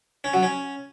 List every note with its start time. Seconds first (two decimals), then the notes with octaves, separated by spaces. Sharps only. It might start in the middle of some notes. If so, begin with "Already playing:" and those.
0.24 C#4
0.34 F#3
0.43 C#4